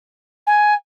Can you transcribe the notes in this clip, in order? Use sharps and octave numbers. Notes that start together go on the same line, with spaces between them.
G#5